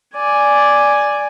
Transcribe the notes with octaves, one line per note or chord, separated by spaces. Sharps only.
D5 G#5